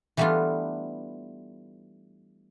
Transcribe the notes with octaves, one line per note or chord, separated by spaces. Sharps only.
E3 G3 A3 B3 D4 F4